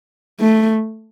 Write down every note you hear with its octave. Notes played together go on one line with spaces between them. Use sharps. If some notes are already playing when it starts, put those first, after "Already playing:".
A3